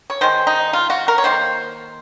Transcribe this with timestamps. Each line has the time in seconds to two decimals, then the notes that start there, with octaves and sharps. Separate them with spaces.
0.10 C#5
0.21 D#3 G#3 C5
0.47 D#4
0.73 F4
0.90 F#4
1.08 A#4
1.18 C#5
1.24 D#3 A#3 C5